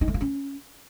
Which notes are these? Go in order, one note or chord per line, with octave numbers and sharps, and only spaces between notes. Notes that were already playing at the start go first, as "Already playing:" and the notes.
D#4
A3
F4
C#4